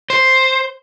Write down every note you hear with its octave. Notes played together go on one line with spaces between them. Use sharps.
C5